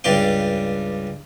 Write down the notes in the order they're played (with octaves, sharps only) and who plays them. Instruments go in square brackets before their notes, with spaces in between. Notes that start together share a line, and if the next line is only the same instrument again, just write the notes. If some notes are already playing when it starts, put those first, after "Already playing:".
[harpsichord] C#2 G2 G3 G4 F5 G5